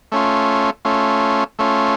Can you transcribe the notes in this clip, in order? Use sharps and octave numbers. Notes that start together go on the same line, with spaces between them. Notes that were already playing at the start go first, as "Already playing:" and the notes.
A3 C#4 F4
A3 C#4 F4
A3 C#4 F4